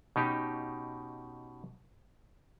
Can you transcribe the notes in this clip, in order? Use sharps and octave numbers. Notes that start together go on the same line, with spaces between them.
B2 C#4 D#4 G4